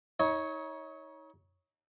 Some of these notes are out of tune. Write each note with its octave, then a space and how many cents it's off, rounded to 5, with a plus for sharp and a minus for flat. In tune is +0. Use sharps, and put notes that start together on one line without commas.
D#4 +35 C#5 +0